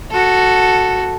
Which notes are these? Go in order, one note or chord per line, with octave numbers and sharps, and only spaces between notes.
F#4 A4